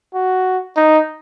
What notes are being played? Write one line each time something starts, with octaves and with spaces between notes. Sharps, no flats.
F#4
D#4